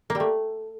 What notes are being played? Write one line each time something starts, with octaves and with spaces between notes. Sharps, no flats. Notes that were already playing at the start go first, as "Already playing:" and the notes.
A#3
G3
A3